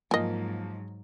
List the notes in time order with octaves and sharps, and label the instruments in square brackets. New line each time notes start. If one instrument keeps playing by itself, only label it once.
[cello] G#2 F#3 [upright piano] F3 A#3 [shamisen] D#5 G#5